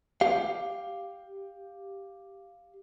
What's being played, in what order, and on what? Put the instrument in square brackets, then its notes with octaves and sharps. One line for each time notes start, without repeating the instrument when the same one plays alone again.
[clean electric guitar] G4 F5